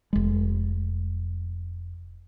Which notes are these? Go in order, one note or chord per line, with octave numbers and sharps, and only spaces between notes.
F1 G#3